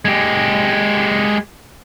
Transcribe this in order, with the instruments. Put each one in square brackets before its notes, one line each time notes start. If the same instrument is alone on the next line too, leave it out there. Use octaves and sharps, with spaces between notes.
[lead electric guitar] G#3 G4